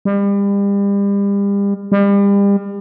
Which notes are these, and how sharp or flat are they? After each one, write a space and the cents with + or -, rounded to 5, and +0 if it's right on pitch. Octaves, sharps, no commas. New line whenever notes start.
G3 +35
G3 +35